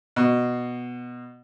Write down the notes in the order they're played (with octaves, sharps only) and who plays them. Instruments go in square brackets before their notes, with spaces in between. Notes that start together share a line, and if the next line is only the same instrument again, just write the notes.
[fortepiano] B2